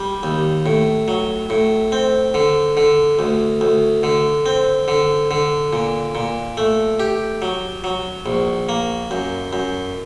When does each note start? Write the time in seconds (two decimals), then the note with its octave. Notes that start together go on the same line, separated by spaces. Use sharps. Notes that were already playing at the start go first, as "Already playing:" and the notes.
Already playing: G3
0.23 D#2
0.66 A2
1.08 F#3
1.50 A2
1.92 C4
2.34 D3
2.77 D3
3.19 D2
3.61 D2
4.03 D3
4.46 C4
4.88 D3
5.31 D3
5.73 A#2
6.15 A#2
6.57 A3
7.00 G4
7.42 F#3
7.84 F#3
8.26 A#1
8.69 A#3
9.11 F#2
9.53 F#2